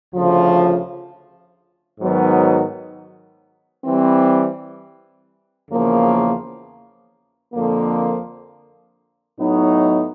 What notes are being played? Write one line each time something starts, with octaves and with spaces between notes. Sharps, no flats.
D2 C#3 F3
G#2 D#3 F#3 B3
E3 G3 C4
E2 C#3 F3 A#3
F2 D3 F3 A#3
A2 F#3 B3 D#4